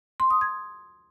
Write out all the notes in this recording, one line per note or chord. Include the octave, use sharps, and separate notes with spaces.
C6
D#6
G#6